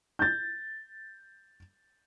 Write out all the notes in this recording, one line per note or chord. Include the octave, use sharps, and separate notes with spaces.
G6 A6